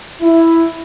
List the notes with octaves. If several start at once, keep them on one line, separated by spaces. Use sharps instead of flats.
E4